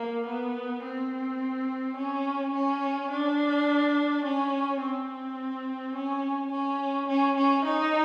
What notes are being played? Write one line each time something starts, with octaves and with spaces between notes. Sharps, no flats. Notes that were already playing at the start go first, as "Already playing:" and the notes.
Already playing: A#3
B3
C4
C#4
C#4
D4
C#4
C4
C#4
C#4
C#4
C#4
D#4